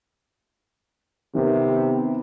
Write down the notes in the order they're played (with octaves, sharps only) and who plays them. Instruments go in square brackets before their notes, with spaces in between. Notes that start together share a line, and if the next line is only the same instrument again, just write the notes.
[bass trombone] C3 [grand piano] D#3 B3